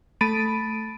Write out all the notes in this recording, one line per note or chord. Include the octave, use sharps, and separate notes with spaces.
A3 B5 A6 D7 D#7